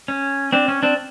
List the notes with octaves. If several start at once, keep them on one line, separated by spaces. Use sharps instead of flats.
C#4
C4 D4
C#4
C4 D4